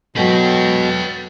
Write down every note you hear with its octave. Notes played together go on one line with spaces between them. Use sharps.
B2 F#3 A4 B4 G5